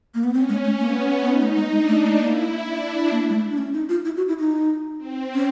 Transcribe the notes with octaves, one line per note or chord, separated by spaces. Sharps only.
A#3
B3
C4 C#4
G#3
A3
A#3 B3
B3 D#4
A3
G#3
G#3 D4
A3
A3
A#3 E4
D4
A#3
G#3
A3
D4
C#4
D#4
F4
E4
F#4
E4
D#4
C4
C#4